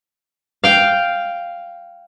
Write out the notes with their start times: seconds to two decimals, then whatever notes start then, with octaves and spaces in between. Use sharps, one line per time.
0.64 F5 G5